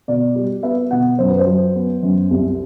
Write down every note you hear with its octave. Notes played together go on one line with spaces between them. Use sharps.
B2 D5
G3
B3 E5
B2 F#5
F#2 C5
B4
C5
F#3
B3
F#2
C2